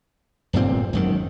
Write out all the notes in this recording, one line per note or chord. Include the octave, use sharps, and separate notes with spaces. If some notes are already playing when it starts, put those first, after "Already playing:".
D1 G1 A#2 C4
G#1 F#2 D#3